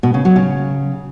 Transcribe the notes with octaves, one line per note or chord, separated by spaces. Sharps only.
B2
C#3
F#3
C#3